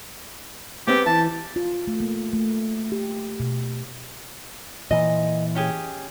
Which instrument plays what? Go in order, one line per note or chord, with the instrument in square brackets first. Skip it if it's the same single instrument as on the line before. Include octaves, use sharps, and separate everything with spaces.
[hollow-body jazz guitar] G#2 B3 C4 [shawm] G4
[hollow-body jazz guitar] E3 [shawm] A5
[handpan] F4
A3
A#3
A3
G4
B2
[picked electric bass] A#2 E3 [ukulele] D#5
[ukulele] C#4 G4 G#4